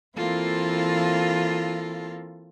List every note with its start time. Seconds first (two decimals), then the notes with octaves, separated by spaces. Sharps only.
0.17 E3 A#3 C4 E4 F4 A4